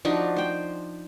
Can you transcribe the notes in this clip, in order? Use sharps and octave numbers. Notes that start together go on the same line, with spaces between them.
F3 D4 D#4 F#4
C5 G5